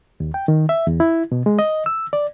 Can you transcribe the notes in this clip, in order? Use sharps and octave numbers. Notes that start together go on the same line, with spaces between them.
D#2
G5
D#3
E5
E2
E4
B2
G#3
D#5
E6
D5